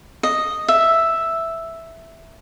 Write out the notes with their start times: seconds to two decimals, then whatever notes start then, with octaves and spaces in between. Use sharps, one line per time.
0.23 D#5
0.68 E5